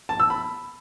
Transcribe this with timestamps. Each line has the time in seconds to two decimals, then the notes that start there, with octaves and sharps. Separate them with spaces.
0.09 A5
0.20 E6
0.30 B5